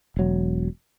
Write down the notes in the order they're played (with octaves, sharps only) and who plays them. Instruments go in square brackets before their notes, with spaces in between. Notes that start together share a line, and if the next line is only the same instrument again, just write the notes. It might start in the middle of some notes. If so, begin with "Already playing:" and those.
[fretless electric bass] E1 F#3